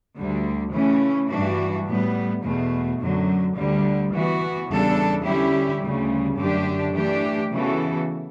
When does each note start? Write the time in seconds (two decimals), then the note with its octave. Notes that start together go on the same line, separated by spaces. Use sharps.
0.17 D2 D3 G3
0.74 C#3 E3 A3 C#4
1.30 G2 E3 G3 D4 F#4
1.86 A2 G3 B3
2.43 E2 B2 A3
3.00 F#2 D3 F#3
3.56 D2 D3 G3
4.12 E3 B3 F#4
4.68 E2 C#3 G3 D4 A4
5.25 D3 G3 C#4 E4 G4
5.82 D2 C#3 G3
6.38 F#2 D3 A3 D4 G4
6.95 E3 A3 D4 G4
7.51 C#3 E3 B3 F#4 A4